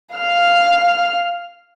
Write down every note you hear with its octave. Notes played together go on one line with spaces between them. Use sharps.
F5 F6